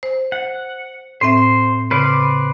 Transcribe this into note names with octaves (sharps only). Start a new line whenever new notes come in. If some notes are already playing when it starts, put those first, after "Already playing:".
C5
F#5
A2 C4 C5 E5
C#3 B4 C5 D5